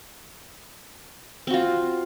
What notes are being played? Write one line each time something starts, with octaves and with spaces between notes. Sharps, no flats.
C4 F4 F#4